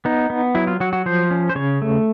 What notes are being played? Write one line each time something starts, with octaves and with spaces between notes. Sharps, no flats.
B3 D#4
B3
F#3 E4
F4
F#3 F#4
F#4
F3 C5
C#4
C5
C#3 C#5
A3